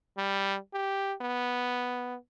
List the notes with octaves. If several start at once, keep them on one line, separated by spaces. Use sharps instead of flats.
G3
G4
B3